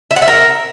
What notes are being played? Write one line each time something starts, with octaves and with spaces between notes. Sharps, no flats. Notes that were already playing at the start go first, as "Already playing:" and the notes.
E5
F#5
E5
A#4